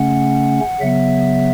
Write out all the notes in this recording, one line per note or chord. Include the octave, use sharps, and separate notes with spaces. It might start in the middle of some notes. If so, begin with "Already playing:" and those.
Already playing: C#3 A3 C#4 F#5
C#3 F#3 B3 E5